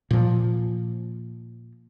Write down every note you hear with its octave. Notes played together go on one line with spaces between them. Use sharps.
A#2 F3